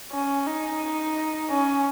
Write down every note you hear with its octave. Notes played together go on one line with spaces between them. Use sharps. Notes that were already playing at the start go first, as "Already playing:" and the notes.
C#4
D#4
C#4